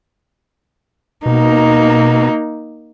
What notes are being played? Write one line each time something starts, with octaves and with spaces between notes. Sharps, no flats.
B2 A#3 D#4